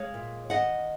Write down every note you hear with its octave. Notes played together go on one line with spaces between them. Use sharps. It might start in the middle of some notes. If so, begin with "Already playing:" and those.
Already playing: G#3 C#5 F5
A#2
D#3 D#5 F#5